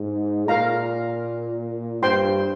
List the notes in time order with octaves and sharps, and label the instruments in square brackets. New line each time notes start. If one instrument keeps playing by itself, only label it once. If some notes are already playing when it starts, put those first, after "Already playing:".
Already playing: [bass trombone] G#2
[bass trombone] A#2 [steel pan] A#4 F5 A#5
[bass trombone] G2 [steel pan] C5 G5 C6